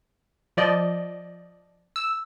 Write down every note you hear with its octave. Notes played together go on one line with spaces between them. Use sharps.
F3 D5 D#5
E6